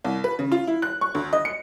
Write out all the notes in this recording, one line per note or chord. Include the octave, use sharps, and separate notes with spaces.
C2
B4
C#3
F4
E4
F#6
C#6
D2
D#5
C#7